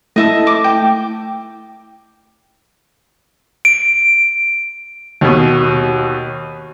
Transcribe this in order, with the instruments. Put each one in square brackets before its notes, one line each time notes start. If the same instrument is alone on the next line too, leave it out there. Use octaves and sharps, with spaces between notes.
[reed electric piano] A3 E4 [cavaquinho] D#5 E5 A5
[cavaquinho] D6
G5
[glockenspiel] D7
[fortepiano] D#2 B2